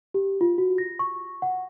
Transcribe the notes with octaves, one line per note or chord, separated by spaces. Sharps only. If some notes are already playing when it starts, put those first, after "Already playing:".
G4
F4
F#4
A#6
C#6
F#5